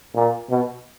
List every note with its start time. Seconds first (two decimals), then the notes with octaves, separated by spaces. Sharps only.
0.15 A#2
0.50 B2